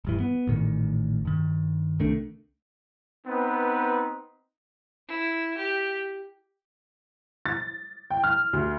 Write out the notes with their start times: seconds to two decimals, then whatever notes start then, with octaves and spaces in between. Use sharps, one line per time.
0.05 D#1 G2 E3
0.20 B3
0.47 A1 A#2 D#3
1.25 G2 D#3
1.99 C2 D#3 A3 D4
3.26 B3 C4 D#4 B4
5.08 E4
5.57 G4
7.46 A6
8.10 G5
8.24 F6
8.53 D2